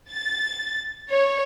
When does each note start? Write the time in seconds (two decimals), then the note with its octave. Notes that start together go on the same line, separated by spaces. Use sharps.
0.11 A6
1.10 C#5